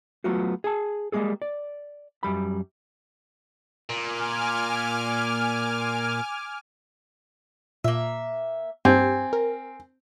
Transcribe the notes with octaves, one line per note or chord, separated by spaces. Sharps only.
F#3 A3 B3 F4 F#4
G#4 A5
G3 G#3 A#3 G#4 A4
D5
F#2 G3 B5
A#2 G#5 D6 F6
A#2 A#3 E5
G2 C4 G4 G#5
A#4